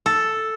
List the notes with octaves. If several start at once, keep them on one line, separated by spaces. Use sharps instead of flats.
A4